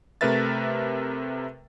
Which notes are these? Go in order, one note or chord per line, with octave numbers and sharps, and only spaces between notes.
C3 A3 A#4 B4 E5 A6